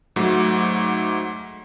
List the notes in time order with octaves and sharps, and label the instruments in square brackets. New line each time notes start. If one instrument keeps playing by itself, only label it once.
[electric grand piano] G#2 F#3 A3 F#4